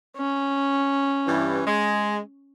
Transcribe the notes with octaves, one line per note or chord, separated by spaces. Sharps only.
C#4
G2 E3
G#3